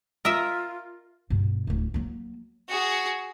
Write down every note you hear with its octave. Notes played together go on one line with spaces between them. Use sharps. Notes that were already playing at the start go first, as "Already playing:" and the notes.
F4 A#4 D#5 E5
G2 B2
D1 D2
F#3 A#3
F#4 G#4